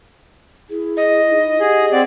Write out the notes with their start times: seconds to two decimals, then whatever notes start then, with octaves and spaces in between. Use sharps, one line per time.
0.70 E4 G#4
0.97 D#5
1.30 D#4
1.60 G4 G#4 F#5
1.92 C4 D5 F#5